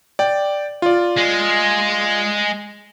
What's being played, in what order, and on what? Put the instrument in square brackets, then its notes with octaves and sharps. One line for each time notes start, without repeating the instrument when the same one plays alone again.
[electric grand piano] D5 G5
F4 D5
[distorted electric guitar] G#3